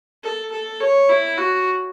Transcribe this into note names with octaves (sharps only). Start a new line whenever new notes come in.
A4
A4
C#5
E4
F#4